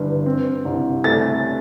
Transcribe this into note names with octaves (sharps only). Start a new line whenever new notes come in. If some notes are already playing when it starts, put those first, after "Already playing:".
Already playing: G1 G2 E3
C4
C2
A3 A6